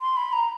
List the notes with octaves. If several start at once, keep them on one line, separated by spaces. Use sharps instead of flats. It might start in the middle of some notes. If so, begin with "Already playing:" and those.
C6
B5
A#5